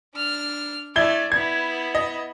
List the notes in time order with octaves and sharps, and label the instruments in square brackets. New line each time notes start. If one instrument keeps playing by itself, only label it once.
[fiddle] D4 F6
[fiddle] A3 D5 [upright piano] E4 G#6 G7
[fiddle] B3 E4 [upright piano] G#6
[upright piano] D#5